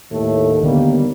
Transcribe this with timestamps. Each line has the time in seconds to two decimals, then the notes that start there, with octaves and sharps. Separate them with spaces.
0.11 D#2 A2 A3
0.63 D3 G3 A#3 B3